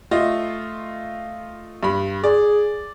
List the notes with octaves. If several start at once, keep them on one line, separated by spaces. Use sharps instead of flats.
A3 F4 D#5
G2 B5
G#4 D5